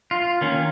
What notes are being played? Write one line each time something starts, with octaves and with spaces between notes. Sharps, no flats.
F4
D#3 A#3 C#4